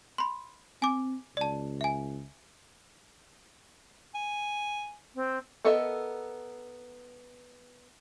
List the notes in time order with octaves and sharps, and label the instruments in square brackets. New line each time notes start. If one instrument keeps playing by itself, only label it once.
[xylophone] B5 C6
[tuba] C4 [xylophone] G#5 D6
[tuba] C#2 [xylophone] D5 A5
[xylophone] E5 G#5
[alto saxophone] G#5
[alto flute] C4
[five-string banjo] B3 A4 A#4 D#5 E5